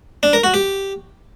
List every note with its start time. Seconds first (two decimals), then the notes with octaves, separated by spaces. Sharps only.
0.23 D4
0.33 A#4
0.43 F#4
0.54 G4